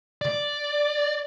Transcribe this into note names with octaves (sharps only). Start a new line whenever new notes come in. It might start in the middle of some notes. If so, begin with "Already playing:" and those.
D5